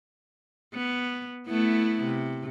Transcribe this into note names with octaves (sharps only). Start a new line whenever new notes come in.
B3
A3 B3 E4
C3